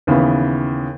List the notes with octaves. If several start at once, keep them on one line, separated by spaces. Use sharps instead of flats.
D#2 C#3 E3 B3